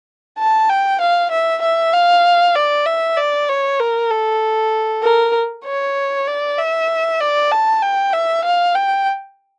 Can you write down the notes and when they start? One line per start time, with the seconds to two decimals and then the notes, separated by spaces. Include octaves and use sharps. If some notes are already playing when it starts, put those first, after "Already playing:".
0.38 A5
0.69 G5
1.01 F5
1.31 E5
1.62 E5
1.94 F5
2.55 D5
2.86 E5
3.17 D5
3.49 C#5
3.79 A#4
4.11 A4
5.03 A#4
5.65 C#5
6.27 D5
6.59 E5
7.21 D5
7.52 A5
7.82 G5
8.14 E5
8.45 F5
8.75 G5